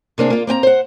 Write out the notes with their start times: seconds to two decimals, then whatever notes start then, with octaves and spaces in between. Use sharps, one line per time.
0.18 C3 A#3 D4 G#4
0.30 A#3 F4
0.47 A#3 C4 G5 A#5
0.63 C5 F#5